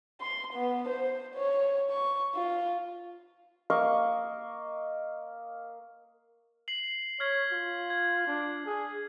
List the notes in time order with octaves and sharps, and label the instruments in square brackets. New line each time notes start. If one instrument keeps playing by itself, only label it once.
[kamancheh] C6
B3
C5
C#5
C#6
F4
[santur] A#3 D#5 F5 C#6
[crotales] C7 F#7
[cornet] C#5 [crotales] F6 G#6 B6
[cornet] F4
[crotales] G#6
[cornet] D4
G#4